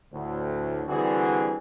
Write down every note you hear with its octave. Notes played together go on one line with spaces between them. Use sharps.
D2 A2
D3 E3 G3 C4 F#4 G#4